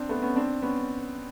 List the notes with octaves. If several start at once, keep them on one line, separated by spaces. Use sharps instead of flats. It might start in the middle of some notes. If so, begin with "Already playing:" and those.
Already playing: C4 D4
A3 B3
B3 C#4
C4 D4
B3 C#4